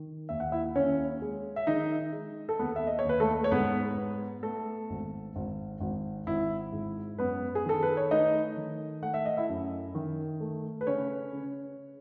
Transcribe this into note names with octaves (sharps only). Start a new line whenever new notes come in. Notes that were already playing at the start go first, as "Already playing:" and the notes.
Already playing: D#3
D#2 E5
F#5
E4 E5
D#2 C#4 C#5
G#3
E5
D#3 D#4 D#5
G#3
A4
D#2 B3 B4
E5
D#5
C#5
D#2 B4
A3 A4
C#5
G#2 B3 B4
B3
A3 B3 A4
G#1
G#1
G#1
G#1 E4
G#2
F#2 B3 B4
G#4
D#3 A4
B4
C#5
A3 D#4 D#5
D#3
A3 F#5
E5
D#5
E4 E5
F#2
D#3
A3
B4
C#3 C#4 C#5
C#3